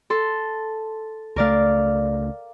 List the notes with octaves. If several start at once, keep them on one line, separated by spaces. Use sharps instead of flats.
A4 C6
C#2 A3 A#4 D5 F5